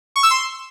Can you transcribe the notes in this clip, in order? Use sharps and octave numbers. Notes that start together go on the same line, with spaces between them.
C#6
E6
C6